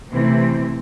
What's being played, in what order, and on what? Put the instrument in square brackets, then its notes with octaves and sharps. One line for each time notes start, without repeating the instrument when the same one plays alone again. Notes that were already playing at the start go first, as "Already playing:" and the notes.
[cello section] C3 E3 A3 C4